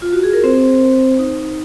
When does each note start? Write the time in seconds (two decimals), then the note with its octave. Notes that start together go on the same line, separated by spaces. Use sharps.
0.02 F4
0.13 F#4
0.23 G#4
0.33 A#4
0.44 C4 C5
1.19 D#4